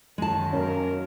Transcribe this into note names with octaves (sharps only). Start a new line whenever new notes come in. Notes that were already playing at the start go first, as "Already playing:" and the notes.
F#2 D#3 G#3 A5
F#3 A#3 C#4 A#4